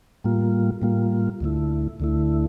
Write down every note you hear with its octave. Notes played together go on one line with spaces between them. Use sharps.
A2 G3 A#3 F4
A2 G3 A#3 F4
D2 D3 A3 E4
D2 D3 A3 E4